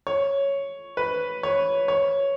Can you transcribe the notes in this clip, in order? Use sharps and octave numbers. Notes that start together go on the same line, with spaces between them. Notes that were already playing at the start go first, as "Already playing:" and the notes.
C#5
B4
C#5
C#5